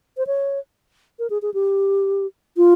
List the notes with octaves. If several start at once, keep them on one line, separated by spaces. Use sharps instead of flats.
C5
C#5
A#4
G#4
G#4
G4
F4